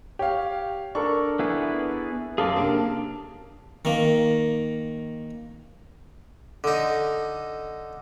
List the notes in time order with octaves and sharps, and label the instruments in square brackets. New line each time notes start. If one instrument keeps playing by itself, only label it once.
[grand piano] G4 [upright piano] C#5 F5
[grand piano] D4 A4 A#4 [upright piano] C#6
[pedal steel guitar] B3 E4 G#4
[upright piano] F#2 [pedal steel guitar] G#4 A4 D6 [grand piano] F5
[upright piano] C3 A#3 [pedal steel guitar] D4
[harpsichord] D#3 A#3
D3 D#4